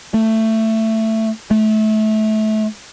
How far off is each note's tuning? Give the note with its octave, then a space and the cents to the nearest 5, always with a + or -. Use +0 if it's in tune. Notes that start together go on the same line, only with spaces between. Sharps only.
A3 +15
A3 -25